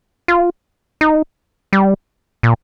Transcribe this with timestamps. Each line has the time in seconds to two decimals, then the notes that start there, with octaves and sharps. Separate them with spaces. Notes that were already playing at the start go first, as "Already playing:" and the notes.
0.28 F4
1.01 D#4
1.73 G3
2.43 A#2